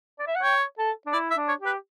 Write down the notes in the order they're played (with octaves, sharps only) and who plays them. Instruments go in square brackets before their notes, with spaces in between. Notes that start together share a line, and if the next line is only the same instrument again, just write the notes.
[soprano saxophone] D5
E5
F#5
[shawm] C#5 [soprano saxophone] G5
[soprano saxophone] A4
D4
[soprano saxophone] E4 [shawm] D5
[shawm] E5
[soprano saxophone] D4
[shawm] C#5
[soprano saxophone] G4
[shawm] B4